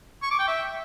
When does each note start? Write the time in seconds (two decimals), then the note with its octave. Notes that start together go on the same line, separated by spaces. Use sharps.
0.22 C#6
0.31 D6
0.39 G5
0.47 E5